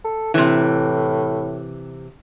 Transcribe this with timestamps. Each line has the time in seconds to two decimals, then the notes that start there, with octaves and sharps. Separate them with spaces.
0.04 A4
0.34 A2 C3 E3